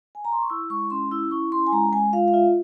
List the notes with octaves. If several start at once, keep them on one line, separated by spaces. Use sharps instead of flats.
G#5
A#5
C6
C#6
E4 E6
G#3 C#6
C#4 C6
E4 E6
E4 C#6
C#4 C6
G#5
G#3 A#5
G#3 G#5
F4 F5
F5
F4 E5